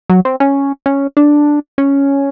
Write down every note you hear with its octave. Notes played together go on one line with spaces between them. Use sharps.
F#3
C4
C#4
C#4
D4
C#4